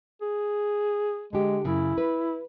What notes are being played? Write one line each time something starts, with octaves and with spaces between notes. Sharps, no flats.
G#4
D3 G#3 G4
F#2 C#3 E4
B4